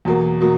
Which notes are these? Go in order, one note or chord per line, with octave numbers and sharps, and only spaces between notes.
E2 B2 F#3 A#3
B2 F#3 A#3